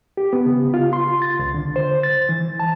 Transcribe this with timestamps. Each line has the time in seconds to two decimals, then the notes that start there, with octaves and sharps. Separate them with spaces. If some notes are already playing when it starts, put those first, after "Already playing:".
0.17 G4
0.33 B3
0.46 C#3
0.74 F4
0.93 C6
1.22 A6
1.39 C#2
1.55 D3
1.76 C5
2.03 A6
2.29 E3
2.60 A5